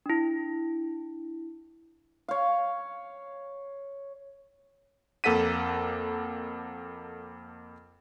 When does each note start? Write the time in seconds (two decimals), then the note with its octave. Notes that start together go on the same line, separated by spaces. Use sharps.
0.06 D4 E4
2.28 C#5 F5
5.24 F2 A#3 A4 F#5 B6 D#7